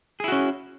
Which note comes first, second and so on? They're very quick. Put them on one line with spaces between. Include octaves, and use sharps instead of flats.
G#4 E4 F#4 C#4